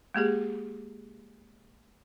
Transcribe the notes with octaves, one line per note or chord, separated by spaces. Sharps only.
G#3 A#3 G4 G#4